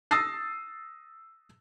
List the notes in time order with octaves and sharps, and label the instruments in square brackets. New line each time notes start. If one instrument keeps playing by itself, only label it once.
[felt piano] D#6 E6 A6 A#6 C7